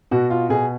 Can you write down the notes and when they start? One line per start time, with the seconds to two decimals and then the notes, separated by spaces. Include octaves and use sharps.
0.11 B2 F#4
0.30 F4
0.49 B2 G#4